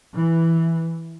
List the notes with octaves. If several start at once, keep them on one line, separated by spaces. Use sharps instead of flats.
E3